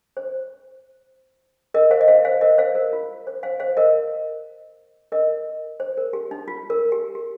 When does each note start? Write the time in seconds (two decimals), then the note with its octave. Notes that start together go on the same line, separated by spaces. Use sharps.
0.17 C5
1.74 A#4 D#5
1.91 C5 F5
2.01 D#5
2.08 C5 F5
2.25 C5 F5
2.41 A#4 D#5
2.58 C5 F5
2.75 A#4
2.93 F4
3.27 C5
3.43 C5 F5
3.60 C5 F5
3.77 A#4 D#5
5.12 A#4 D#5
5.80 C5
5.97 A#4
6.13 G4
6.31 D#4
6.48 F4
6.70 A#4
6.92 G4
7.15 G4